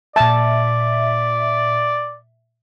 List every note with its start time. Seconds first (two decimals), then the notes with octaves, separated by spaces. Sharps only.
0.16 A#2 D5 E5 A5